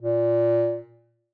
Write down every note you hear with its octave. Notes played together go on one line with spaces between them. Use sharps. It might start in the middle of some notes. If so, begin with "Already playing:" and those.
A#2